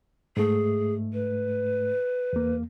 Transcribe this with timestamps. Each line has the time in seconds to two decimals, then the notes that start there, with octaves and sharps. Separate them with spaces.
0.37 G#2 A3 G#4
1.14 B4
2.33 E2 A#3